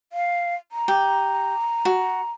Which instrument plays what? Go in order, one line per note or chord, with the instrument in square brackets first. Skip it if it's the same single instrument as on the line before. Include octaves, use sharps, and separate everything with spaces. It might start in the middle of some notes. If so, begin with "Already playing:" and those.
[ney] F5
A#5
[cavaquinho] G4
F#4